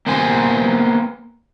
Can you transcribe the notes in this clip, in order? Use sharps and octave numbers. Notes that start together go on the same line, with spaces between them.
A#3 B3 C5 G#5